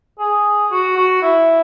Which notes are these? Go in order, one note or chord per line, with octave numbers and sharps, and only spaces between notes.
G#4
F#4
F#4
E4